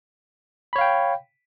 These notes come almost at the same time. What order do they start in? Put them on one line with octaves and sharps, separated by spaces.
B5 C#5 F5 G5